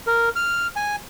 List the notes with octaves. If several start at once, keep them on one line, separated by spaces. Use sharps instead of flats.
A#4
F6
G#5